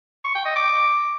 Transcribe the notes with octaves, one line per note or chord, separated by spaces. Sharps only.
C#6
G5
D#5
D6